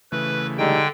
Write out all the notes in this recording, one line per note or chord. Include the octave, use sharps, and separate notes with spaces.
C#3 E3 A3 B4
D3 G3 G#3 D#4 G5